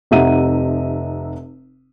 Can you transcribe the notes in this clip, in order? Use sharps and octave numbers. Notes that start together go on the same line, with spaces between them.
F1 C3 D#4 E5 F#5 D#7